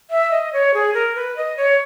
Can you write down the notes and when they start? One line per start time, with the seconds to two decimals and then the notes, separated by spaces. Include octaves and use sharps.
0.10 E5
0.31 D#5
0.53 C#5
0.74 G#4
0.94 A#4
1.16 B4
1.37 D#5
1.57 C#5